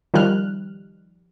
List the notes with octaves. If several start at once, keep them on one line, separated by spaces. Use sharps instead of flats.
D#3 F3 G3 F6 F#6